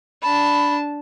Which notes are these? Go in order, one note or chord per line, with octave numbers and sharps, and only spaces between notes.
D4 A5 B5